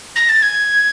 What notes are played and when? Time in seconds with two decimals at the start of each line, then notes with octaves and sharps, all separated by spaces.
0.16 A#6
0.29 A6
0.43 G#6